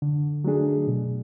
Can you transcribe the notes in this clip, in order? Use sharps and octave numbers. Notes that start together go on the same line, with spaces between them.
D3
F#3 A3 D4 G#4
B2